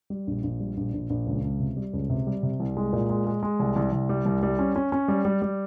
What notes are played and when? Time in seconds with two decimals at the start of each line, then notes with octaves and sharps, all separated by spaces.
0.10 G3
0.27 A#1
0.43 A#1
0.60 G3
0.77 A#1
0.94 A#1
1.10 A#1
1.27 C#2
1.44 C#2
1.60 C3
1.77 G3
1.93 C#2
2.10 C3
2.27 G3
2.43 C3
2.60 C2
2.77 G#3
2.93 A#2
3.10 G#3
3.27 G#3
3.43 G#3
3.59 C2
3.76 C2
3.92 C2
4.09 G3
4.26 C2
4.43 G3
4.59 C#4
4.76 C#4
4.92 C#4
5.08 G3
5.25 G3
5.42 G3